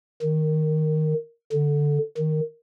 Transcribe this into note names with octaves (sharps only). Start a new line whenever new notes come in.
D#3
D3
D#3